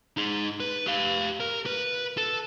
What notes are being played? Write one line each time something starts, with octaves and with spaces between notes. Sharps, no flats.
D#4 G#4
B4
G4 F5
A#4
B4
A4